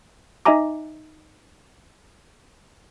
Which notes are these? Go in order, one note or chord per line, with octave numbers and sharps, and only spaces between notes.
D#4 D#5 E5 G#5 A#5 D6